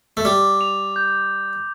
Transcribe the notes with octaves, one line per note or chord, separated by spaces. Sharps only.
A3
G3 D6
F7
G6